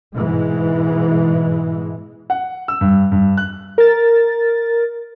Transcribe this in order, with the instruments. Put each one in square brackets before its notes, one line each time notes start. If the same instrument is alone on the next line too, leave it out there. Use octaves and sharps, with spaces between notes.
[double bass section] G#2 B2 E3 G#3
[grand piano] F#5
E6
G2
G2
F#6
[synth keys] A#4 A6